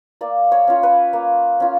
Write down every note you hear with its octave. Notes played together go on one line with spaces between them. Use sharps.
A#3 D5
C#5
C#4 F4
B4
A#3
C#4 F4